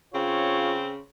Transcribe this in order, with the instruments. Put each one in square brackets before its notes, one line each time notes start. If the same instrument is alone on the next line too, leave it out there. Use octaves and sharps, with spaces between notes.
[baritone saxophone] C#3 [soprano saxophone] C4 [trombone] F4 [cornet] C#5